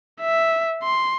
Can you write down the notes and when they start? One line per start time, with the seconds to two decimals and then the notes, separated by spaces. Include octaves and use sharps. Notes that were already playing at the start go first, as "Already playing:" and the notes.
0.21 E5
0.83 C6